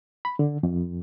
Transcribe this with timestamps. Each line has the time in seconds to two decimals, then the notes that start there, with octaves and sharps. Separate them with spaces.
0.25 B5
0.39 D3
0.63 F2